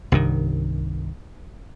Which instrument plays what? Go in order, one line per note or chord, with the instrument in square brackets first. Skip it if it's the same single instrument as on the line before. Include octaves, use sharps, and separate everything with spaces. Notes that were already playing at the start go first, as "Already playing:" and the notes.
[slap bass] C2 G2 D#3